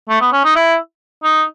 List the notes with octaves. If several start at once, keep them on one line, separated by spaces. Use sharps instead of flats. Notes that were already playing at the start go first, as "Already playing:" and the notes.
A3
B3
C#4
D#4
E4
D#4